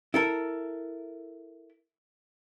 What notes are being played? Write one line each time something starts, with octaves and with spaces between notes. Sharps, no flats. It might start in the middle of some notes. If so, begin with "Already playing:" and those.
E4 A4 A#4